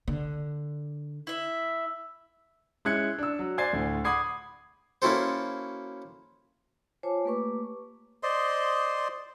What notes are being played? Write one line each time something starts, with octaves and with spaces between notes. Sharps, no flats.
D3
E4 E5
G#3 C#4 E4 F#6 G#6 C#7
D4 E6
F#3
C5 D5 G#5 G#6 A6 C7
D2 A2
F#5 B5 D6 D#6 G#6 C7
A#3 C#4 E4 F#4 A4 C5
F4 C5 C#5 G#5 A5 D6
A3 A#3 G4 B4 C#6 D6
C5 D5 D#5 C6